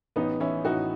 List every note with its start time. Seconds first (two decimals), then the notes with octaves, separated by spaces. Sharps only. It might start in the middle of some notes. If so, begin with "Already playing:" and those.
0.16 A1 B3 D#4
0.40 E3 C#4 E4
0.65 A2 D#4 F#4